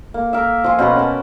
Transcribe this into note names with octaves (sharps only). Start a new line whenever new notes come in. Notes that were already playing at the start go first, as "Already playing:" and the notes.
A#3
A#4 E5
F3 F4 G#5
B2 C#4 A#4 F#5
C#4 A5